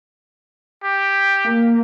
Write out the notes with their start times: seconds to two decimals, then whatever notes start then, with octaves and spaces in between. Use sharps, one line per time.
0.84 G4
1.45 A#3